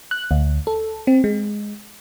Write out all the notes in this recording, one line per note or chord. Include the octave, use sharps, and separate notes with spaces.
F#6
D2
A4
C4
G#3